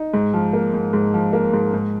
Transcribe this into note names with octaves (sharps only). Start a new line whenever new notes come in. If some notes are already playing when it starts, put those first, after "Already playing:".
Already playing: D#4
G#2
F3
A#3
G#2
G#2
F3
A#3
G#2
G#2